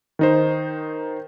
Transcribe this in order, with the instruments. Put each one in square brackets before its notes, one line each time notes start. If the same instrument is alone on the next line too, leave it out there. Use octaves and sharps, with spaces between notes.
[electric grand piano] D#3 D#4 C5